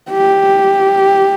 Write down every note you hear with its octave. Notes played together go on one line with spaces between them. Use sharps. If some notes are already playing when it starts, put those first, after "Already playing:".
G4